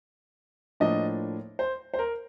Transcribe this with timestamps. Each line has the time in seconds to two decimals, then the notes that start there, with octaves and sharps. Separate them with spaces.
0.80 A2 F3 A#3 D4 D#5
1.59 C5
1.94 C5
1.99 A#4